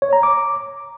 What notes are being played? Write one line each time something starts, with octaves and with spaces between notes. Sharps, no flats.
C#5
A#5
D6